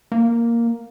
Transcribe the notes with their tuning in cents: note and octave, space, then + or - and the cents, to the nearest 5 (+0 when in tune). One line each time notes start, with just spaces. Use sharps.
A#3 +0